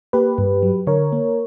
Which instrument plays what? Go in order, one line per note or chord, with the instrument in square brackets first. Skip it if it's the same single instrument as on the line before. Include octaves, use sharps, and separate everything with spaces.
[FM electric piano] A#3 G4 B4
G2
F#3
D3 A#4 C#5
A#3